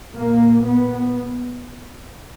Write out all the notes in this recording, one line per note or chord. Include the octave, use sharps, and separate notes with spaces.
A#2 A#3
B3